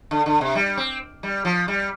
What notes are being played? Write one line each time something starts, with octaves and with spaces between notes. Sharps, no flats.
D3
D3
C3
G3
C4
G3
F3
G3